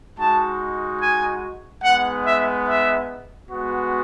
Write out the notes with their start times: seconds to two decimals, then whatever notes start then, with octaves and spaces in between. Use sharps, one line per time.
0.17 G#3 D#4 F#4 A5
0.99 G#5
1.82 G#3 B3 D#4 F#5
2.25 E5
2.66 E5
3.49 G#3 B3 F#4